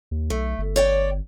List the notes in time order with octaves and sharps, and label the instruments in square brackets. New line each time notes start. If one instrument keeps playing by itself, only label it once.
[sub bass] D#2
[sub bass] B1 [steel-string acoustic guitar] A3
[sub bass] G1
[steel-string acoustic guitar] C#5 D5 G5